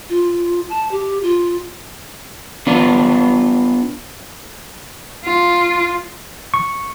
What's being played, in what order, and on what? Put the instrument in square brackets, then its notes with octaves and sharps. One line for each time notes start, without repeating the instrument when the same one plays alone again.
[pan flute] F4
A5
G4
F4
[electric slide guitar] B3 D4 F4
[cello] F4
[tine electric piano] C#6